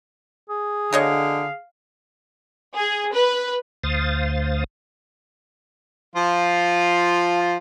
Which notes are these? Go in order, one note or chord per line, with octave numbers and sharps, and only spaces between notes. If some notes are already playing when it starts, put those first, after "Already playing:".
G#4
B2 D3 C#5 D#5 F5
G#4
B4
D2 C5 F5 D#6 A6
F3 F4